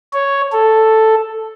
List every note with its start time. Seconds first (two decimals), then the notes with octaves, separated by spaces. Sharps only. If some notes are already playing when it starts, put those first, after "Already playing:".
0.13 C#5
0.52 A4